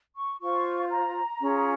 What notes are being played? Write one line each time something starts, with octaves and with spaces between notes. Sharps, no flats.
C#6
F4 C5 C#6
A#5
C#4 F4 G#4